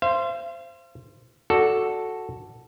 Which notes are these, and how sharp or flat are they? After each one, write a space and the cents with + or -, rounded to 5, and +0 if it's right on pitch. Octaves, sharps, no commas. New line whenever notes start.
C5 +0 F5 -45
F#4 +0 A4 +0 D5 +0